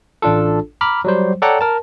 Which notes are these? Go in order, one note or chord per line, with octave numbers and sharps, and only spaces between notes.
A1 D4 F4 A4
A#5 B5 D6 F6
F#3 G3 C5
A4 C#5 D5 F#5 G5 A#5
A#4 A5